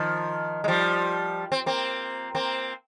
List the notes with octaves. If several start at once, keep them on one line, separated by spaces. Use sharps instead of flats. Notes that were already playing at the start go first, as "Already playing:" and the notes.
Already playing: D#3 F3
G#3
F3 G3
C4
A#3 C4
A#3 C4